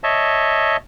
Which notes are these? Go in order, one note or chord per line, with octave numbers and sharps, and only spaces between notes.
C#5 D#5 E5 A5